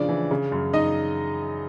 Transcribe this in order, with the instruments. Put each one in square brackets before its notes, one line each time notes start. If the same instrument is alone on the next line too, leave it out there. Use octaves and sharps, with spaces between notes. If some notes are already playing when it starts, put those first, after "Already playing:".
Already playing: [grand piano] C#3 F3 [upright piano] D4 D5
[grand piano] E3
C#3
F#2
[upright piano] D#4 D#5